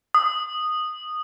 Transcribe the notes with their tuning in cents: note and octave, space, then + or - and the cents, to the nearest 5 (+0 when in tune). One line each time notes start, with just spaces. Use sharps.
D#6 -10